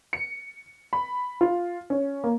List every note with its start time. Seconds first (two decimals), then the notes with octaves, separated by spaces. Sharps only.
0.13 C#7
0.93 B5
1.41 F4
1.90 C#4
2.24 A#3